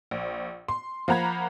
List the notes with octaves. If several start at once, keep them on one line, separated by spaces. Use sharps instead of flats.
A#1
C6
F3 A#3 F#5 A#5 B5 G#6